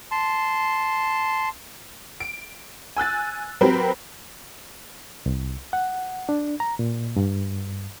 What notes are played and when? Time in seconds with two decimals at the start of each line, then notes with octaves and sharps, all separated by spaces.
0.11 A5 C6
2.20 D7
2.97 G#5 E6 F#6 A6
3.61 F#3 C4 G4 A#4 B4
5.26 C2
5.73 F#5
6.29 D4
6.60 A#5
6.79 A#2
7.16 G2